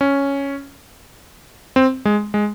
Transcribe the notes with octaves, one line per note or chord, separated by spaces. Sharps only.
C#4
C4
G#3
G#3